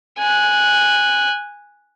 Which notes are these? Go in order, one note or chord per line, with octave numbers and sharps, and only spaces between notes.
G#5 F#6